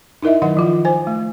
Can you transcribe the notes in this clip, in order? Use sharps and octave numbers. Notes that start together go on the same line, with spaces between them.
D#4 E4 A#4 D#5 E5
D#3 F#3 D#4 D#5 F#5
F3 F4
C5 G#5
A3